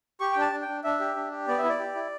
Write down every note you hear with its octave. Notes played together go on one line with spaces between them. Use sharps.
G4 C#6
D4 G5
A5
D4
G5
D4
D4 E5
G4
D4
G4
B3 D5
E5
E4
D5
G4
E4